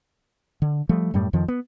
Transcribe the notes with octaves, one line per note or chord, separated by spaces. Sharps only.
D3
F3 G3 A3
F#2 A2 G3
F2 D#3 F3
B3